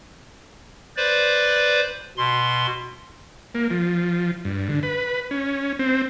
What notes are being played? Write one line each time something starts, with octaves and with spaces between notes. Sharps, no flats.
B4 C5 D5
B2 C6
A#3
F3
G2
D3
B4
C#4
C4